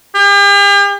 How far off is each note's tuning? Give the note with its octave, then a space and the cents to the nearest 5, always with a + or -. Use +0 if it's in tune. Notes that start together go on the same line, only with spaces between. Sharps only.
G4 +45